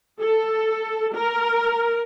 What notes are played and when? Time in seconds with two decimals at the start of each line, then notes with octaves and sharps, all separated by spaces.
0.20 A4
1.15 A#4